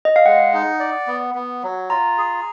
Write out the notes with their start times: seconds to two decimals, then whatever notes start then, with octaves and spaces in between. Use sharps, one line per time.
0.05 D#5
0.16 F5
0.26 G#3 F#5
0.54 D#4
0.80 D5
1.07 B3
1.35 B3
1.63 F#3
1.90 F4 A#5
2.18 G#4